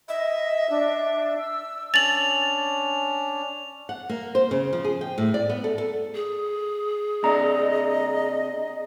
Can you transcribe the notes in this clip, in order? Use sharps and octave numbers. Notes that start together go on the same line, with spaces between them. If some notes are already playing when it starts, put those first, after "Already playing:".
D#5 E5
D4
E6
C#4 D4 A6 F7 F#7
F#5
A#3
C5
C#3
F3
G#4
G5
A2
D5
B3
A4
A4
G#4
C3 D4 D#5 A#5